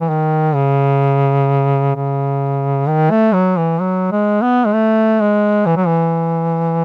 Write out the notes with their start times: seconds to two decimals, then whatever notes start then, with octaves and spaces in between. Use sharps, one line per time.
0.01 E3
0.09 D#3
0.55 C#3
1.95 C#3
2.88 D#3
3.11 A3
3.34 F#3
3.57 E3
3.81 F#3
4.12 G#3
4.42 B3
4.66 G#3
4.74 A3
5.21 G#3
5.66 E3
5.77 F#3
5.87 E3